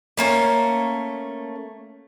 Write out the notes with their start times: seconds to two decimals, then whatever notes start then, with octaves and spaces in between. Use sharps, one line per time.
0.17 A3 A#3 C4 C#4